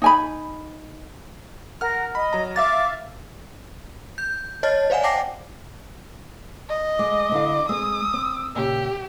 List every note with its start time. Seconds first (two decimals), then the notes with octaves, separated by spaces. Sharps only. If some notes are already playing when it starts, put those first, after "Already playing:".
0.02 D#4 G#5 B5
1.81 A#4 F#5 F6
2.15 D#5 B5
2.33 F#3 A#5
2.56 E5 F5 D6 A6
4.18 G6
4.63 C#5 D#5 A5 F6 A6
4.90 C5 D5 F5 F#5 G#5
5.03 G5 A5 D6 A#6 C7
6.69 D#5
6.99 G#3 D6
7.32 D3 E4 F5
7.69 G#3 C4 D#6 E6
8.13 C4
8.55 A#2 C#3 G4